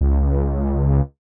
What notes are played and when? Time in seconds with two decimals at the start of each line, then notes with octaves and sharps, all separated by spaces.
0.01 C#2